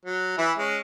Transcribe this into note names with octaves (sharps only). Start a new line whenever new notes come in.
F#3
E3 B4 E5
G#3 C#4